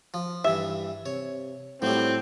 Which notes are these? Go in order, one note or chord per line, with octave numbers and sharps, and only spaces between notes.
F3
G2 E3 E5
C3 C#5
A2 F#3 G3 C4